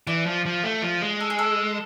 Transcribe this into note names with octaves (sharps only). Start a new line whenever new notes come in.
E3 D5
F3
F3
A3
F3
G#3
A4
G#4
A4